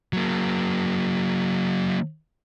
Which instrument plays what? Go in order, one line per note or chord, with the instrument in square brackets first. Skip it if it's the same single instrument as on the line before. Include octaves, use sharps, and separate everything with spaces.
[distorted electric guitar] F#3 A#3